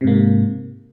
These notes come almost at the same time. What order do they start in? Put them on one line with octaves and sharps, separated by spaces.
C3 G#2 A#3